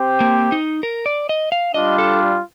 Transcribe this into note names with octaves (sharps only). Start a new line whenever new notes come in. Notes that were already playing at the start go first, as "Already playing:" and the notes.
Already playing: C4 G4 C5 G5
A#3
D#4
A#4
D5
D#5
F5
G3 D4 F4 D#5
A4